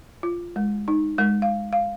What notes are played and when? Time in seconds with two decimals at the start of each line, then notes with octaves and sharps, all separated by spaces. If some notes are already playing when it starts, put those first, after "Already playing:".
0.23 F4
0.56 G#3
0.88 D#4
1.18 G#3
1.42 F5
1.73 F5